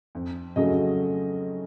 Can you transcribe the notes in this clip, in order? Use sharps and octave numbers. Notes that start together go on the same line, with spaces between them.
F2
C#3 F#3 A3 D#5